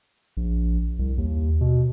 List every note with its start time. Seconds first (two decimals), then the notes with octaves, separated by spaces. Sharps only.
0.37 A#1
0.99 C2
1.18 D#2
1.61 B2